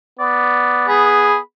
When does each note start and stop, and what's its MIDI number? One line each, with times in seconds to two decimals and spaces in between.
0.19 1.40 59
0.19 0.86 74
0.89 1.37 68
0.89 1.38 83